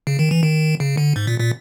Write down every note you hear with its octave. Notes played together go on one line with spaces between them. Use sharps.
C#3
D#3
E3
D#3
C#3
D3
G#2
A#2
A#2